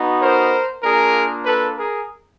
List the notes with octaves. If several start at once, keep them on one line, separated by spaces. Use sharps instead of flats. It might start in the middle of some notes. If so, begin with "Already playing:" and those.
Already playing: B3 D#4 F#4
A#4 C5
A#3 D4 F4 G#4 A#4
A4 B4
G#4 A#4